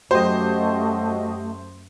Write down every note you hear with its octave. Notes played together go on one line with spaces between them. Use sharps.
F#2 A3 F#4 G4 C5 D#5